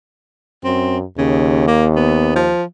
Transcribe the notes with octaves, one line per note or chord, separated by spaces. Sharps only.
F#2 C4
D#2 C#3
A#3
B3
F3